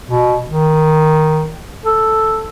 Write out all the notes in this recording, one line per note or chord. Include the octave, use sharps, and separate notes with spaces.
B2
D#3
A4